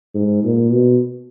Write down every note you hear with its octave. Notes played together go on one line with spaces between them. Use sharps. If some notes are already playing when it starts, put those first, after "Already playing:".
G#2
A#2
B2